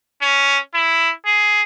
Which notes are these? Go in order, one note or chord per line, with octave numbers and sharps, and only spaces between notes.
C#4
E4
G#4